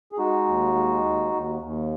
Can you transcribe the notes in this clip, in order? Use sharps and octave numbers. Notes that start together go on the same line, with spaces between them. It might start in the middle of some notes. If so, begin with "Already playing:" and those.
G#4
G#3 D#4 F#4
D#2
G#3
D#2
D#2
D#2